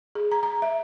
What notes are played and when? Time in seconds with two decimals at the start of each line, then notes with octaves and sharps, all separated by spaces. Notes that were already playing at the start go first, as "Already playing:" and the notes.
0.15 G#4
0.32 A#5
0.43 A#5
0.62 E5